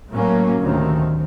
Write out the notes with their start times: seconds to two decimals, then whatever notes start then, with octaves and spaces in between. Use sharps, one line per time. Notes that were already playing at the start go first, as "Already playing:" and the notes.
0.10 A2 F#3 A#3 C#4
0.60 D2 C3 D#3